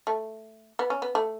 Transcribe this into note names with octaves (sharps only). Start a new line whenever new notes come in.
A3
B3
C#4
B3
A3